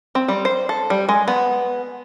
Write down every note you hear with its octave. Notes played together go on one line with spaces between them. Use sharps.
C4
G3
C5
A4
G3
G#3
B3